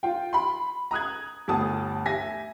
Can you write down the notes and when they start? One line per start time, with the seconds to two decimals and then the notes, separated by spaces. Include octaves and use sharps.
0.03 F4 G5
0.33 B5 C6
0.91 A#5 D#6 F#6 G#6
1.48 G1 D2 A5 D#6
2.06 G4 E5 G#5 A#6 B6